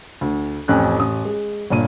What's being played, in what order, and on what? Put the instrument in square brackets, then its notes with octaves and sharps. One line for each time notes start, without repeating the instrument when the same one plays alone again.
[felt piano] D2
A1 F2 C#4 F#6
A1 D#6
G#3
G1 A#2 D#7